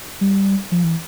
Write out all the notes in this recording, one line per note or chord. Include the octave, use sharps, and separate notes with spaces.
G3
F3
E3